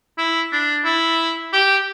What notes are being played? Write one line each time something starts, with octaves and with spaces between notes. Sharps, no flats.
E4
D4
E4
G4